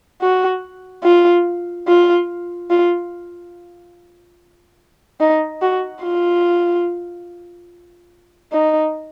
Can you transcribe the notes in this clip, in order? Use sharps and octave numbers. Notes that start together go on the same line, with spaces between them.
F#4
F4
F4
F4
D#4
F#4
F4
D#4